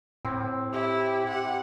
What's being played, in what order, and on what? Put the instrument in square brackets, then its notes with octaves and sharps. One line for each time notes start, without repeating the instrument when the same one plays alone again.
[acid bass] A2 [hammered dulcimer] C4
[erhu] E4 [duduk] G4
[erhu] F#5